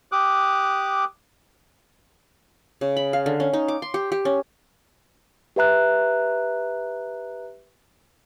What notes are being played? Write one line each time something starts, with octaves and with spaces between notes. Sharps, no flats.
G4 D6 D#6 F#6
C#3
B5
F5
D3
C#4
D#4
D6
C6
G4
G4
C#4
G4 B4 E5 A#5 F#6